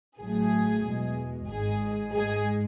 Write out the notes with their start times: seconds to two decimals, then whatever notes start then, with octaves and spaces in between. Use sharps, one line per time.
0.19 A1 A2 F#3 A3 G#4
0.84 E2 B2 G#3
1.49 G#1 G#2 G#3 G#4
2.14 G#2 G#3 G#4